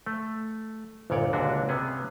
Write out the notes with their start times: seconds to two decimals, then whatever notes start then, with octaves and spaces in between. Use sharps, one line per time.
0.06 A3
1.10 G1 C2 A#2 C#5 D5
1.33 C#2 A#2 D3 D4 F#4
1.69 C3 B3 C#4 G#4